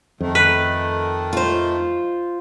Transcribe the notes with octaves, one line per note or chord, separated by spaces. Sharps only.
F2 D#3 A3
B4
F4 C5